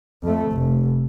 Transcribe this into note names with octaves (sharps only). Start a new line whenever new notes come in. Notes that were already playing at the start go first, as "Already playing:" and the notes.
F2 A3
F1